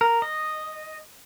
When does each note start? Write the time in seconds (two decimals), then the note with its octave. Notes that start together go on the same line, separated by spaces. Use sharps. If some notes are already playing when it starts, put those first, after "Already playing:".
0.01 A#4
0.22 D#5